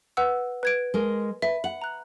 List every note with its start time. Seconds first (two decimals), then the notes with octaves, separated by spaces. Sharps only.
0.17 B4 F#5 E6
0.63 B4 G#6 D7
0.94 G#3 A#4
1.42 B4 E5
1.64 F#5 F#7
1.82 A#5 F#6